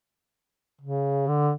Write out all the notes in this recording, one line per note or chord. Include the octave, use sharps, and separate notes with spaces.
C#3
D3